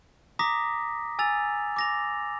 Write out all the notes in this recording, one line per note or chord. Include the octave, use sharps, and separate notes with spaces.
A#5 D6 D#6 A#6 B6
G#5 E6 A6 F7
D6 A#6 F7